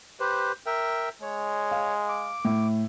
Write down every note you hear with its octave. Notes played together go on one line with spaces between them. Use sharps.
G4 B4 C5
A#4 E5 G5
G#3 C#5
F5
D6
A2